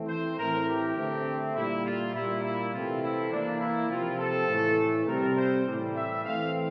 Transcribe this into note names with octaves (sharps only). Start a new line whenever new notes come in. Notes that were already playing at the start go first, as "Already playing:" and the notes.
Already playing: E3 A3 C4
C5
A2 E3 A3 C4 A#4
G4
D3 A3 C4
A#2 G3 A#3 E4
F4
A#2 G3 A#3 E4
E4
C3 E3 A3 C4 F4
E4
E3 A#3 D4
E4
C3 F3 C4 F4
A4
A2 E3 A3
C3 G3 C4 A#4
C5
A2 E3 G3
E5
E3 A3 C4 F5